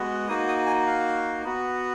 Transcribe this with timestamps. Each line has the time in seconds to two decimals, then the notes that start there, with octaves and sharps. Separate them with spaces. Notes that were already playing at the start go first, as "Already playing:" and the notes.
Already playing: G#3 B3 F#4
0.28 A#3 D#4 F#4 D#6
0.48 D#6
0.66 G#5
0.87 F5
1.45 B3 F#4